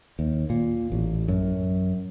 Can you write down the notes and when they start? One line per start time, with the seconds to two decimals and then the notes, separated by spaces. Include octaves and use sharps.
0.19 D#2
0.50 A#2
0.92 A1
1.28 F#2